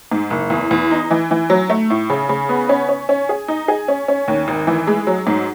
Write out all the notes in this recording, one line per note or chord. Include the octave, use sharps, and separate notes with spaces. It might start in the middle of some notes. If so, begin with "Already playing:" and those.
G#2
F#1
E2
E2
D#4
E3
E3
F#3
A3
A2
C#3
C#3
B3
C#4
C#4
C#4
G#4
D#4
G#4
C#4
C#4
D#2
G#1
E3
G#3
F#3
G#2